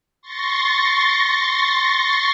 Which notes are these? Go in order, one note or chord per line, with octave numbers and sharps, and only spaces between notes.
C6 C#6 A6 A#6